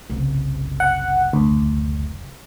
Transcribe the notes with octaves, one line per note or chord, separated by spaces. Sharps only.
F#1 C2
F#5
D2